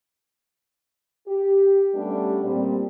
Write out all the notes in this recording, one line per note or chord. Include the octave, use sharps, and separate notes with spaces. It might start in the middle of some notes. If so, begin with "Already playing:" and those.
G4
G3 A3 B3 C#4 D4 G4
A#2 G3 C4